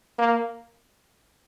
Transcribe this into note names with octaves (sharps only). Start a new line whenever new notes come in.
A#3